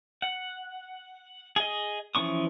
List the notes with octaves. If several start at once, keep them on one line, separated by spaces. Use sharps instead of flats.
F#5
G#4 D#5
E3 F3 C#4 C#6 D#6